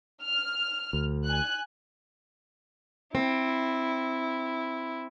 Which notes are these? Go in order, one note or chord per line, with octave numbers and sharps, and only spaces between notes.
F6
D2
G#5 F#6
C4 E4